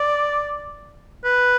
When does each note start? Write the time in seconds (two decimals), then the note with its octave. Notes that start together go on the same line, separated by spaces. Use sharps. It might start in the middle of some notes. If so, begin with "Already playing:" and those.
Already playing: D5
1.25 B4